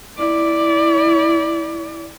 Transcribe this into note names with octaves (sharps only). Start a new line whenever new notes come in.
E4 D5